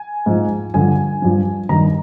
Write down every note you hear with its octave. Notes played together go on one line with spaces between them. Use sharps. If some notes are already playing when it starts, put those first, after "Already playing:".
Already playing: G#5
G#2 F3
G2 D3 F3 G#5
G2 F3
G2 D#3 A#5